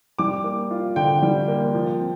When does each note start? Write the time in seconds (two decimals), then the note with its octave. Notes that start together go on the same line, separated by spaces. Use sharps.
0.19 G3 D6
0.44 A#3
0.71 F4
0.96 D3 G5
1.22 G3
1.48 A#3
1.74 F3
2.00 C4